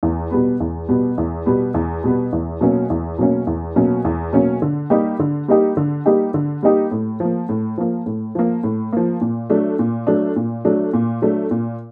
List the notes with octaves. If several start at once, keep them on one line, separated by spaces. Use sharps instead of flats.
E2
B2 G3 B3
E2
B2 G3 B3
E2
B2 G3 B3
E2
B2 G3 B3
E2
B2 F#3 A#3 C#4
E2
B2 F#3 A#3 C#4
E2
B2 F#3 A#3 C#4
E2
B2 F#3 A#3 C#4
D3
G3 A#3 D#4 G4
D3
G3 A#3 D#4 G4
D3
G3 A#3 D#4 G4
D3
G3 A#3 D#4 G4
A2
F3 A#3
A2
F3 A#3
A2
F3 A#3
A2
F3 A#3
A#2
F#3 A3 D4
A#2
F#3 A3 D4
A#2
F#3 A3 D4
A#2
F#3 A3 D4
A#2